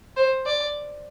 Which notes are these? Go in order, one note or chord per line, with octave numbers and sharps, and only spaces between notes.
C5
D5